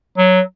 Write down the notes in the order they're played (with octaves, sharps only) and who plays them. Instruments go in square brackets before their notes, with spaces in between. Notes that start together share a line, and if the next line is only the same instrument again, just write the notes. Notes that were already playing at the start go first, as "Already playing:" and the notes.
[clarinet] F#3